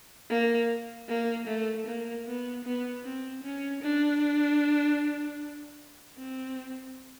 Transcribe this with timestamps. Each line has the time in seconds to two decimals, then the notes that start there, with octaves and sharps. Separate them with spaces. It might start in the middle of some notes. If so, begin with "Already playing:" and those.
0.30 A#3
1.09 A#3
1.47 A3
1.86 A#3
2.26 B3
2.64 B3
3.04 C4
3.43 C#4
3.82 D4
6.18 C4